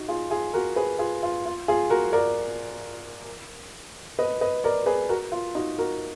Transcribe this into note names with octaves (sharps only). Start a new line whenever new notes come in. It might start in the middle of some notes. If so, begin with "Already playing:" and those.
Already playing: D#4 F#4
F4 G#4
F4 G#4
F#4 A#4
G#4 B4
F4 G#4
F4
F4
F4 G#4
F#4 A#4
A#4 D5
B4 D#5
B4 D#5
A#4 D5
G#4 B4
F#4 A#4
F4
D#4 F#4
F#4 A#4